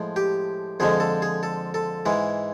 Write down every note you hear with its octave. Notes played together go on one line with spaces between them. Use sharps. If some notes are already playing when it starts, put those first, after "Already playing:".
Already playing: A2 F3 G#3
G4
F2 D3 F3 G#3 G#4
A4
G#4
A4
A4
G#2 E3 G#3 G#4